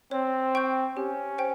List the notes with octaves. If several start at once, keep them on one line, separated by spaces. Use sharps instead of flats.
C4 C#5
G5 C#6 G6
C#4 G4
C5 G5